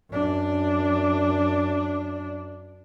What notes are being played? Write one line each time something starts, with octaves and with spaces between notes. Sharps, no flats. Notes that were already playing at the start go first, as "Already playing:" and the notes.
F#2 D4